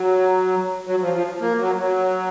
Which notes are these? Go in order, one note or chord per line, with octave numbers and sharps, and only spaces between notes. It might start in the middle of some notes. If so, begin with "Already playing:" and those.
Already playing: F#3
F#3
F3
F3
A#3
F#3
F#3